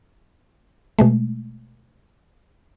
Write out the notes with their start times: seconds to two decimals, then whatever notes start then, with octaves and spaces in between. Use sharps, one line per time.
0.99 B2 G#3 A3